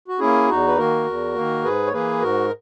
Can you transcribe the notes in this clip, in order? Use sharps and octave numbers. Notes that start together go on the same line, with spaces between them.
F#4
A#3 C#4 E4 G#4
E2 D#4 F#4
B4
D#3 A#3 F#4 A#4
E2
D#3 A#3
G#2 G#4 B4
C#5
E3 A#3 G#4 B4
G#2 F#4 A#4